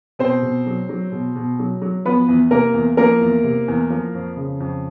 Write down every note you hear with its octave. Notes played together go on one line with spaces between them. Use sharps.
B2 C4 C5
B2
F#3
F#3
B2
B2
F#3
F#3
F3 B3 B4
E2
C3 A#3 A#4
E2
F3 A#3 A#4
E2
C3
E2
F3
F2
C#3
F2